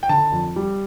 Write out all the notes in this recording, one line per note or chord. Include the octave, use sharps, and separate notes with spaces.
G5
D3 A5
F2
G3